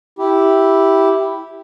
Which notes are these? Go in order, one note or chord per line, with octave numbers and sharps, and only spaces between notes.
E4 G4